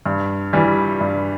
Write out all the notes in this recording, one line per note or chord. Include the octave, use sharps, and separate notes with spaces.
G2
E3 G3
G2